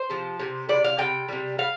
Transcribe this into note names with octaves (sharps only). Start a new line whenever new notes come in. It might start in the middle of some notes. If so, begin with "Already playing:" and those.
Already playing: C5
C3 F3
C3 G3
C3 G3 D5
F5
C3 G3 G5
C3 G3
G3 F5